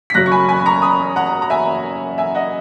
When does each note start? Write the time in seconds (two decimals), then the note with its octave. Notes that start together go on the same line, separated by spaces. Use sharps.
0.10 B6
0.14 F#2 C#3 F#3 F#6 A#6
0.26 C#6
0.32 G#5 B5
0.49 G#5 B5
0.60 B5
0.66 A#5 C#6
0.82 B5 D#6
1.16 F#5 A#5
1.42 A#5
1.50 E5 G#5
2.18 E5 G#5
2.35 D#5 F#5